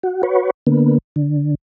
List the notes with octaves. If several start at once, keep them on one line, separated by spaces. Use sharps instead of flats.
F#4
F#4 B4 C#5
D3 A#3 B3
D3